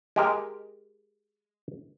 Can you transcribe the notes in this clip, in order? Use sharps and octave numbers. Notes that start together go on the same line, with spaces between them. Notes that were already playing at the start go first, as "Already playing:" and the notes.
G#3 G4 A#4